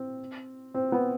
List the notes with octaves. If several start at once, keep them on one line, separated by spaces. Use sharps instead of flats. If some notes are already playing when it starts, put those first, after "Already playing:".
Already playing: C4
C4
B3